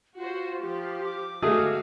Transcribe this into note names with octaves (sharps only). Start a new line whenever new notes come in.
F4 F#4 C5
F3 G4
D6
G#3 A3 F#4 G#4 F5